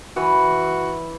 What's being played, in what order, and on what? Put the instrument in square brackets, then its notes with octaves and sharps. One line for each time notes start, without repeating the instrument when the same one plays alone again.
[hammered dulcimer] E3 [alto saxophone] F#4